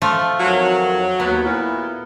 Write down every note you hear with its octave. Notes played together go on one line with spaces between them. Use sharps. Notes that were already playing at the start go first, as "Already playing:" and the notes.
F3 A3 F4
F2 D#3 F#3 C#5
D#2 B3 F#4
A#2 E4